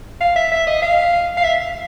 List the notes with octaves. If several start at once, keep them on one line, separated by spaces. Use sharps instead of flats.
F5
E5
E5
D#5
F5
F5
E5